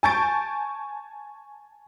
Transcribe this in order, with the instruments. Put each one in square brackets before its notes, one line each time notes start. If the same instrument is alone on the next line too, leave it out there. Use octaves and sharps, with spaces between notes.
[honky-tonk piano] G#5 A5 C#6 G6 A6 D7